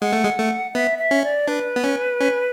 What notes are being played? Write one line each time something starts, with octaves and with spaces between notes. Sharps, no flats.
G#3 F#5
A3
G#3
A3
B3 E5
E5
C#4
D5
D4 B4
B3
C#4
C#4